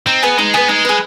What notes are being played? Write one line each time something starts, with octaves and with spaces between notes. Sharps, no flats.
C4 D#4
B3 G#4 B4
G#3 D#4
B3 G#4 B4
G#3 D#4
G#4 B4